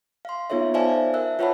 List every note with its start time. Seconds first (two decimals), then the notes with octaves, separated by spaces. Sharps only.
0.25 F5 C6
0.50 B3 D#4 F4 A4 C#5 E5
0.74 C5 D5 E5 F5 G#5 A5
1.14 A#4 E5 E6 F#6
1.39 F4 B4 C#5 F#5 A5 B5